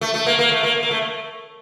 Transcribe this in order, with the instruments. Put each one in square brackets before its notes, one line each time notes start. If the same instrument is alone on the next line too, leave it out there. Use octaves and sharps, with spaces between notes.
[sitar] A3
A3
A#3
A#3
A3
A#3
A#3
A3